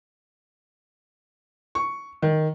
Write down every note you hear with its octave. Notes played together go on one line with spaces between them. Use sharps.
C#6
D#3